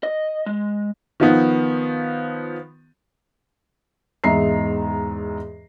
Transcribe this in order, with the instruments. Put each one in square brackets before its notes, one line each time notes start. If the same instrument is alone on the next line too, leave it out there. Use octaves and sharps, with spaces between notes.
[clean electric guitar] D#5
G#3
[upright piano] D#3 F3 B3
[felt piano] E2 G#2 D#5 E5 A#5 C7